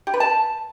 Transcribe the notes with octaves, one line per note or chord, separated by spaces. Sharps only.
G4
B4
A5